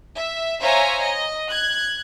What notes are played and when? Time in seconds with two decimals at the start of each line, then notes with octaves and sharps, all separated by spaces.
0.15 E5
0.61 C5 C#5 E5 F5 G#5 A#5
1.02 D#5
1.49 F#6 G#6